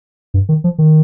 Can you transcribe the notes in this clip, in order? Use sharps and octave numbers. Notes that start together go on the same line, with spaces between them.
G2
D#3
F3
D#3